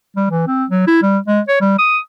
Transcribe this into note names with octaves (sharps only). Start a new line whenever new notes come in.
G3
E3
C4
F#3
E4
G3
G#3
C#5
G3
D#6